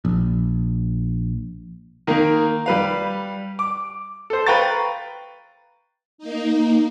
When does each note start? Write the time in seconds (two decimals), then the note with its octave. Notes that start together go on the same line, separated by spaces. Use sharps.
0.05 A#1
2.07 D#3 A#3
2.66 G3 B4 F5
3.59 D6
4.30 A4 C5
4.46 B4 F5 G5 A#5 C#6 A6
6.18 A#3 D#4